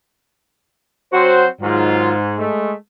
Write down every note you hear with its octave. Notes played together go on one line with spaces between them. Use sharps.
F#3 C4 F#4 C5
G#2 D#3 F#3 F4
G#3 A3